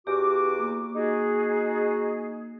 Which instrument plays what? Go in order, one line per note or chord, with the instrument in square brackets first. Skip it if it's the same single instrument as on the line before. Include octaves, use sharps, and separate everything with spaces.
[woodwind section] E2 F#4 D6 [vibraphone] G4
[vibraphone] A#3
[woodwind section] D#4 F#4 G#4